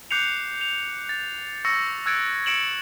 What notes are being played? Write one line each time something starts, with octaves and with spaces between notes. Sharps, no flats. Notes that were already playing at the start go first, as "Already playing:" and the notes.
D6 F#6 G6 C7 C#7 F7
F7
A6
C#6 E6 A#6 C#7
E6 F#6 G#6 A6 C#7 D7
E6 C#7 D7 E7 F#7